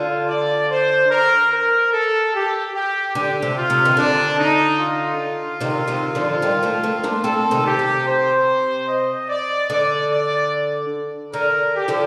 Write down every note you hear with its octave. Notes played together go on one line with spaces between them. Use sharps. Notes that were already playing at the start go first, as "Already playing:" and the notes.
Already playing: D3 F4
D5
C5
A#4
A#4
A4
G4
G4
D3 G4
C3
F4
C3
D#3
D3 D4
D#4
F4
C3 D#3
C3 D#3
D3 F3
D#3 G3
F3 A3
A3 C4
A#3 D4
A3 C4 A4
C3 D#3
G4
C3
C5
D#5
D5
D3 D5
D5
D3 A#4
G4
D3 F3